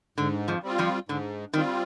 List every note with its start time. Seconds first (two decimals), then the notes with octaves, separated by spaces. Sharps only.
0.18 G#2 D3
0.48 F2 F3
0.63 G3 C4 F4
0.78 F2 F3
1.09 G#2 D3
1.53 D#3 G3 C4 F4